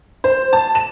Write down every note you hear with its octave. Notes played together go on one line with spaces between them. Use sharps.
C5
A5
E7